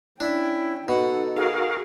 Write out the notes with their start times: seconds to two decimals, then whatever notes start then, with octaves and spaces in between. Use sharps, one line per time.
0.20 C#4 D4 E4 G5
0.88 B2 D#4 A4 F#5
1.37 F#4 G#4 A#4 F5